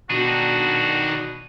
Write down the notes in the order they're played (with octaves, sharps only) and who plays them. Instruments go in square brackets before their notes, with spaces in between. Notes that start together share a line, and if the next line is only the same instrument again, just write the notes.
[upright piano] B2 [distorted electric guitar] D#3 D4 [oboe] F#4 [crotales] D#7